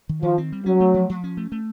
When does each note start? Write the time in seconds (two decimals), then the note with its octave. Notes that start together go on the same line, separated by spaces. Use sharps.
0.09 D#3
0.23 D#3 F3
0.38 C4
0.52 G3
0.66 F#3 C#4
0.80 A3
0.94 F3
1.09 F3
1.24 C#4
1.37 A3
1.52 A3